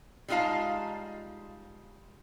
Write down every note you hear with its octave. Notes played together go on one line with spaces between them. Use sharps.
G3 G#3 D#4 F4 F5 A5